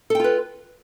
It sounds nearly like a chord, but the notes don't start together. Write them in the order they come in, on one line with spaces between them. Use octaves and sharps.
A4 G5 F4 B4